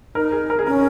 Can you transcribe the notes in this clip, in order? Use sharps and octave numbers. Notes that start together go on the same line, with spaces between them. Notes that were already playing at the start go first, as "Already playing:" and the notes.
D#4 A#4
G#4
A#4
G#4
C#4 A#4